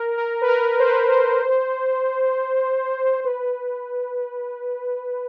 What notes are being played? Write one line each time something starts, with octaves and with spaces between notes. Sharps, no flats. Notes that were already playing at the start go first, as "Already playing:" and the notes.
Already playing: A#4
A#4
B4
A#4
C5
B4
A#4
B4
C5
C5
B4